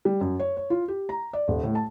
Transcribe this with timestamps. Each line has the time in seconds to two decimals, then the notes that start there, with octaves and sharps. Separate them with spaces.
0.05 G3
0.21 F#2
0.39 C#5
0.57 C#5
0.70 F4
0.88 G4
1.09 A#5
1.33 D5
1.48 D#1
1.63 A2
1.75 A5